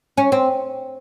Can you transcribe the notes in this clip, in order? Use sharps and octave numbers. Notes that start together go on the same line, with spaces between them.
C#4
C4